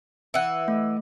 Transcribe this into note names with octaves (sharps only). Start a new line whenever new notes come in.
E3 F#5
A3